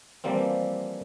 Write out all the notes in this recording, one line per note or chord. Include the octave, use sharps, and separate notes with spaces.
E3 F3 G3 A#3 C4